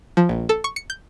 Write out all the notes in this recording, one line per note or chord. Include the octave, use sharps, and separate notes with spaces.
F3
A#1
A4
C#6
C#7
G6